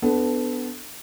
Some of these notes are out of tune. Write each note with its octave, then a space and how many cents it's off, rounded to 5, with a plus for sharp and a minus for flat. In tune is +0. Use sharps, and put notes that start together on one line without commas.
B3 +15 D4 +0 A4 -10